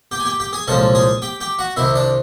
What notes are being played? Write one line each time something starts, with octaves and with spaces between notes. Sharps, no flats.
G4 G5
G#5
G4 G5
G4 G5
G#4 G#5
C2 A#2 F3 G#3 C#4 A4 A5
G#4 G#5
G4 G5
G4 G5
F#4 F#5
C2 C3 D#3 E4 E5
D4 D5